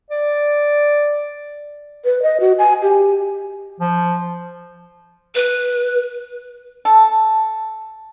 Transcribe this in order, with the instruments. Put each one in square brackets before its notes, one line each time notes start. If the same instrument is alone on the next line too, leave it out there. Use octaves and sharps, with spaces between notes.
[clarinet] D5
[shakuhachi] B4
D#5
F#4
G#5
G4
[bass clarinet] F3
[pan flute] B4
[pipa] A4